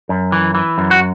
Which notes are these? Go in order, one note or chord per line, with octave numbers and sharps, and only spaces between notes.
F#2
E3
E3
F#2
F#4